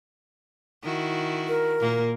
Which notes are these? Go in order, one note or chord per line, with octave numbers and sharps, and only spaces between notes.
D#3 E4 F#4
A#4
A#2 A#3